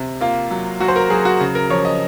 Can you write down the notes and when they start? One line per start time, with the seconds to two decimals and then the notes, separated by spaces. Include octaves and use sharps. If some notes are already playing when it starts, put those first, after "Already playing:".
Already playing: C3
0.21 A#3 F4
0.50 F#3
0.80 F#3 F#4
0.88 C5
0.96 A#4
1.10 F#3 G#4
1.25 F#4
1.40 C#3
1.55 A#4
1.70 F3 C#5
1.85 D#5